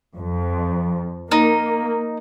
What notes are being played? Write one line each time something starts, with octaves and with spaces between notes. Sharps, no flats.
F2
A#3 D#4